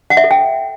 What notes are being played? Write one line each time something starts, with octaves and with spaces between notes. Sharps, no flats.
F#5
E5
A4
G5